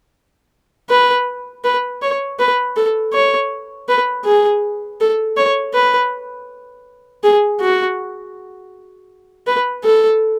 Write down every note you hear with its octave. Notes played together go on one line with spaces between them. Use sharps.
B4
B4
C#5
B4
A4
C#5
B4
G#4
A4
C#5
B4
G#4
F#4
B4
A4